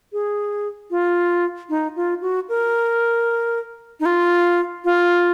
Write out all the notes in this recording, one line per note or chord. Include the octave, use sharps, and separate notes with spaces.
G#4
F4
D#4
F4
F#4
A#4
D#4
F4
F4